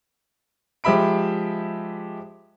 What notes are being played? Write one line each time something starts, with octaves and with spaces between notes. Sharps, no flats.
F3 G#3 G4 E5 B5 D7